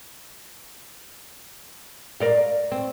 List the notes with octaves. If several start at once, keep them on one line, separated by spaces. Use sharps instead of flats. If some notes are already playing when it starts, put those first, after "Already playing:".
A#4 D5 F5
C4